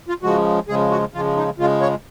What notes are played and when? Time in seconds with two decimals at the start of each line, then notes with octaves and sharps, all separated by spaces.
0.09 F4
0.23 C#3 F3 G#3 F#4
0.68 C#3 F3 G#3 G#4
0.91 F#4
1.14 C#3 F3 G#3 F4
1.37 D#4
1.58 C#3 F3 G#3 F4
1.81 C#5